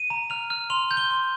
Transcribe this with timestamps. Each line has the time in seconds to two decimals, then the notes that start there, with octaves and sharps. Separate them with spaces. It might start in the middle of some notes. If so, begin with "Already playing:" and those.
Already playing: D#7
0.10 A#5
0.30 F6 F7
0.50 F6
0.70 C6 F7
0.91 G6
0.97 G7
1.11 C6